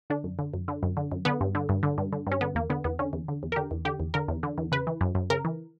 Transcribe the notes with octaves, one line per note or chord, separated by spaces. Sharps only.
D3 D4
F#2
D3
F#2
D3
F#2
D3
F#2
D3 B3
G2
D3
G2
D3
G2
D3
G2 C#4
D3 B3
E2 A#3
D3 B3
E2 B3
D3 C#4
E2
D3
E2
A#4
D3 G4
E2
D3 G4
E2
D3 A#4
E2
D3
E2
C#3 B4
E3
F#2
F#2
C#3 A#4
E3